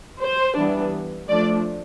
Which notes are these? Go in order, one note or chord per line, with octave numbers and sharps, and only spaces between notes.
C5
E3 G3 B3 D4
F3 A3 D4 D5